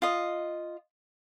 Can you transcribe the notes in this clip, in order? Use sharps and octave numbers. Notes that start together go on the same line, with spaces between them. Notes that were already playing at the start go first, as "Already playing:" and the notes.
F4 D#5